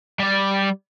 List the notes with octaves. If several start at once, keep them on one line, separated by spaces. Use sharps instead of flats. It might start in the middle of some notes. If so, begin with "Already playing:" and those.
G3 D5